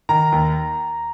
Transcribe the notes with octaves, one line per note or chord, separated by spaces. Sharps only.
D#3 A#5
D#2